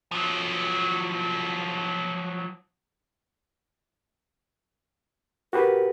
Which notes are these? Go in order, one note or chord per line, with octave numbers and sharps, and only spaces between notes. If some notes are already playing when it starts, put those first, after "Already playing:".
F3 F#3
F#4 G4 A#4 B4